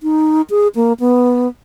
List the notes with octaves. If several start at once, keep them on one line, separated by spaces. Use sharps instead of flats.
D#4
G#4
A#3
B3